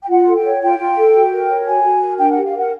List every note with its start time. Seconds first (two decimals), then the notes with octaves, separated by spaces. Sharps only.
0.03 G5
0.09 F4 F#5
0.27 A4
0.35 G5
0.45 C#5
0.62 F4 G5
0.79 F4
0.97 A4
1.14 F#4
1.32 A#4
1.49 C#5
1.66 F#4 G#5
1.83 F#4
2.01 A#4
2.18 D4 G5
2.31 G4 F#5
2.44 F5
2.53 A#4 F#5